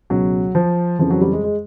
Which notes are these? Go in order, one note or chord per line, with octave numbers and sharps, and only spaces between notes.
C#2 B2 F#3
F3
F2 C#3 E3 F3
F#3
G3
G#3
G#3